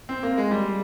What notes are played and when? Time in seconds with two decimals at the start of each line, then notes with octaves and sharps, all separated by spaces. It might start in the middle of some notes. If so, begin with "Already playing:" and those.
0.09 C4
0.23 A#3
0.38 G#3
0.51 G3